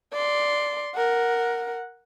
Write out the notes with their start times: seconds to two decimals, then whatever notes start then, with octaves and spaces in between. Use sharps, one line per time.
0.13 D5 C6
0.94 A#4 F#5